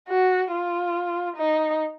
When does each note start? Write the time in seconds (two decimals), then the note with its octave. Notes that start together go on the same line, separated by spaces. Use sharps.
0.08 F#4
0.52 F4
1.37 D#4